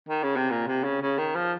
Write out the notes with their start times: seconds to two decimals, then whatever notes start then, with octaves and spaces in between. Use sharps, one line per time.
0.09 D#3
0.23 C#3
0.36 C3
0.50 A#2
0.67 C3
0.84 C#3
1.01 C#3
1.18 D#3
1.35 F3